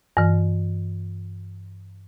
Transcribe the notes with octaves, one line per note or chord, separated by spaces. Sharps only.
G2 E3